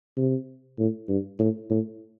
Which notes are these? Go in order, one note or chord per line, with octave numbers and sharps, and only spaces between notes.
C3
A2
G2
A2
A2